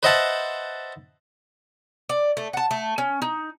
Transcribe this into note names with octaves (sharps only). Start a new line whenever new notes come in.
B4 C5 D#5 E5 F#5 A5
D5
A3
F#5 A5
A3
C#4
D#4